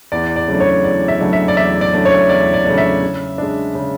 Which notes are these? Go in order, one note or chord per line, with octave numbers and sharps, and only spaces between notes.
E2 D5
D5
C#3 F#3 A3 D4
C#5
E2 D5
E5
C#3 F#3 A3 D4
E5
D5
E2 E5
D5
C#3 F#3 A3 D4
C#5
E2 D5
D5
C#3 F#3 A3 D4
E5
C#3
G#3 D4
C#3